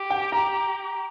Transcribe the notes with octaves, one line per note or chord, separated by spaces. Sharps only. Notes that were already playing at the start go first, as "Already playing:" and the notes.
Already playing: G4
G5
A#5